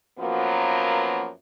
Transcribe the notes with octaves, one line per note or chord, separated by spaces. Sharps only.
F#2 F3 F#3 A#3 B3